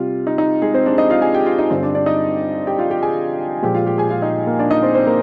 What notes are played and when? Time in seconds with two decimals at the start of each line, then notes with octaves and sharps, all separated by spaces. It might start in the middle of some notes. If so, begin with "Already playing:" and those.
Already playing: C3 G3 F4
0.27 D#4
0.38 D#4
0.62 G#3 G#4
0.74 C4 C5
0.86 D4 D5
0.98 D#4 D#5
1.10 F4 F5
1.22 G#4 G#5
1.34 G4 G5
1.46 F4 F5
1.59 D#4 D#5
1.70 G2 D3 G3 C4 C5
1.83 D4 D5
1.95 D4 D5
2.06 D#4 D#5
2.67 G4 G5
2.79 F4 F5
2.90 G4 G5
3.03 G#4 G#5
3.62 A#2 F3 G#3 G4 G5
3.75 F4 F5
3.87 G4 G5
3.98 G#4 G#5
4.10 F4 F5
4.22 D#4 D#5
4.47 A#3 A#4
4.59 D4 D5
4.71 D#4 D#5
4.83 C4 C5
4.94 C4 C5
5.07 A#3 A#4